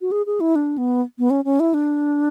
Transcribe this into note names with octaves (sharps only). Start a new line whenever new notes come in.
F#4
G#4
G#4
E4
D4
B3
B3
C#4
C#4
E4
D4